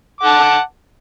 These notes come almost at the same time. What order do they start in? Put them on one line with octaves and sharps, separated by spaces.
D6 F#5 A5